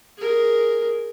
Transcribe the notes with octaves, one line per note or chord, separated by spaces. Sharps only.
G#4 A#4